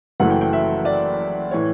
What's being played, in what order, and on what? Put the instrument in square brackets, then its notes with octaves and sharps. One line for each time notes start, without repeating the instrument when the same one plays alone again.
[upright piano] F#1 F#2 E3 A3 F#5
G5
G5
E5
D5
A2 E3 C#5